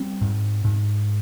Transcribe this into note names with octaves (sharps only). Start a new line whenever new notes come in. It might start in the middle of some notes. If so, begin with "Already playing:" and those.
Already playing: G3 C4
G#2
G#2